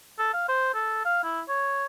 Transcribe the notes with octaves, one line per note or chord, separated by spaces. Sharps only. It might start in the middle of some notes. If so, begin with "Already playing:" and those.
A4
F5
C5
A4
F5
E4
C#5